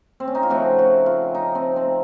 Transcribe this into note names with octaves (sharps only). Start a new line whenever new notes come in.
C4
C#4
D#4
F4
C#3 F3 A3 C4 F#4
F#4
F4
D#4
C4
C4